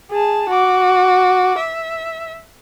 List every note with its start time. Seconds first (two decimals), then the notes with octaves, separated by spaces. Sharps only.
0.11 G#4 A5
0.49 F#4 D6
1.58 E5